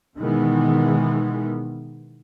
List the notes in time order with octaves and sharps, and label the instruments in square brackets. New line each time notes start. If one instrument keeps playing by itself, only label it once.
[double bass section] B2 D#3 E3 G#3 B3